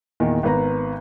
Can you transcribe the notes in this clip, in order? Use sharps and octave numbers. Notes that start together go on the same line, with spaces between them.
E2 A#2 D#3
G#1 B3 B4 A#5